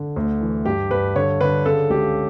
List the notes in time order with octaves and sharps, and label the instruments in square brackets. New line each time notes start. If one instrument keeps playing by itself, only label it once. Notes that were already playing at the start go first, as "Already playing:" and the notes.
Already playing: [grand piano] D3
D2
E3
G2 G4
G2 B4
D3 C#5
D3 B4
C#3 A4
C#2 G4